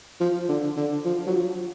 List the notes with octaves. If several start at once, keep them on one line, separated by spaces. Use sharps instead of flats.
F3
D3
D3
F3
F#3
F3